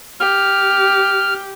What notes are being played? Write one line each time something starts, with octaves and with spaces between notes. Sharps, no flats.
G4 F6